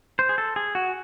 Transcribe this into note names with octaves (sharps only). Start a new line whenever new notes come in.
C5
G#4
A4
G#4
F#4